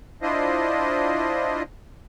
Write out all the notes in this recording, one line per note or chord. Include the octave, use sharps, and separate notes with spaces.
D4 E4 F4 C5 D#5